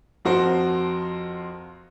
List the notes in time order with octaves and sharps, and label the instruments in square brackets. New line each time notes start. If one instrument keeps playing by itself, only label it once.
[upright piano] F2 F3 F#4 A#4 C5